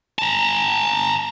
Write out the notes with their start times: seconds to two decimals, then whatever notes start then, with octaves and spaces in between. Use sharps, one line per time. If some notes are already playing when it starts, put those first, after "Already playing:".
0.19 A5 A#5